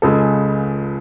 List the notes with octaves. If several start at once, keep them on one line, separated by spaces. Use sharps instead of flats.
C#2 C#3 G#3 A4